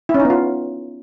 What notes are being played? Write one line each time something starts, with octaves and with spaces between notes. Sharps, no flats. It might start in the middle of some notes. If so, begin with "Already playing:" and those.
E4
C#4
D#4
B3
F4